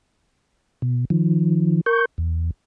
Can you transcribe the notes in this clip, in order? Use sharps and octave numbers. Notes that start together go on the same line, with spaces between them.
B2
D#3 F3
A#4 C#6 G6
E2